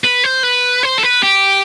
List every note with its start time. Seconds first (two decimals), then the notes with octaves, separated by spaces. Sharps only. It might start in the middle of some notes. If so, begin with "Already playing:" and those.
0.04 B4
0.24 C5
0.43 B4
0.83 C5
0.98 A4
1.03 B4
1.23 G4